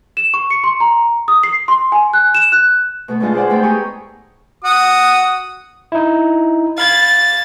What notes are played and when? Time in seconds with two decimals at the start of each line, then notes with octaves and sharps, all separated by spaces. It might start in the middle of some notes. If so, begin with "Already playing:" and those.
0.17 E7
0.34 C#6
0.51 C#7
0.64 C6
0.80 A#5
1.28 D#6
1.43 C7
1.68 C6
1.92 G#5
2.14 F#6
2.35 E7
2.52 F#6
3.08 B2 A3 B3
3.20 B2 D3 G#3 D#4 F4 A5
3.33 G#4 C5 D5 F#5
3.49 A3 B3 D#4 A4 G5
3.62 G4 G#4 A#5 C#6 D#6
4.64 F#4 D#6
5.92 D#4 E4
6.78 F5 B5 G#6 A6